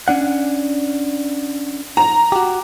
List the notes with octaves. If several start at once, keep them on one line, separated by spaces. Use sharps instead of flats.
C#4 D4 F#5
A#5
F#4 G4